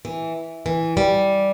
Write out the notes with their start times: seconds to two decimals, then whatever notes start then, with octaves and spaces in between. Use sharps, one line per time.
0.05 E3
0.66 E3
0.97 G3